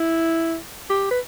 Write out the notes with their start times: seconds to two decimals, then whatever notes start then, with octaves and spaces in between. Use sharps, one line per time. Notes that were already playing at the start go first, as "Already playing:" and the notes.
Already playing: E4
0.90 G4
1.11 B4